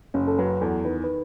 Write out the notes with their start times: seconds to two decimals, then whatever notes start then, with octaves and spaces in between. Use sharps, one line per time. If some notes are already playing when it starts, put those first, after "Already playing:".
0.14 F#1 C#4
0.28 A4
0.39 F#3 B4
0.61 E2 A4
0.85 D#3 B4
1.04 B4